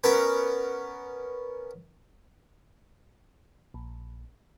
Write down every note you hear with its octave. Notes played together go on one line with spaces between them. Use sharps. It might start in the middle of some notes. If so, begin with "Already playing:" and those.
B3 C#4 A#4 B4 B5
A#1